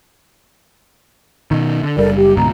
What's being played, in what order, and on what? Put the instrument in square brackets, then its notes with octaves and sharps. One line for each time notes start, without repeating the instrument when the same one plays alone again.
[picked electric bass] B2 D#3
D3
[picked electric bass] F#1 G3 [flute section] A4 A#4 D5
[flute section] G4
[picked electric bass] D2 G#2 B2 [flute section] A#5